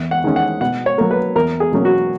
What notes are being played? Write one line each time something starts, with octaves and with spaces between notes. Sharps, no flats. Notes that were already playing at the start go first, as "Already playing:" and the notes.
Already playing: E2
F#5
D#3 G#3 C#4
F#5
B2 F#5
C#5
F#3 A#3
B4
E2 A#4
G#4
B2 F#3 A#3 C#4
F#4